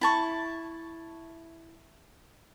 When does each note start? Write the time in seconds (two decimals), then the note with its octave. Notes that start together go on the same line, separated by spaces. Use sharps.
0.01 E4 A5 C#6